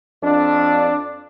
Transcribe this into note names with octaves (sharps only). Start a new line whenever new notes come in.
F2 D4